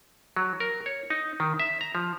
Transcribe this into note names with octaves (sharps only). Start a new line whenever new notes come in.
F#3
A#4
C#5
D#4
D#3
E5
A#5
F3